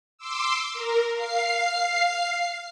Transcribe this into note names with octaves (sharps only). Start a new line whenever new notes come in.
C6 D6 E6
A#4
F5 C7